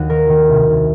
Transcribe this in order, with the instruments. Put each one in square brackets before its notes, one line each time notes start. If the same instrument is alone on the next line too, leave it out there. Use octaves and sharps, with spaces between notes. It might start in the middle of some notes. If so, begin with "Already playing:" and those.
Already playing: [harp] D#2 F#4
D#3 A#4
D#3
C2
C2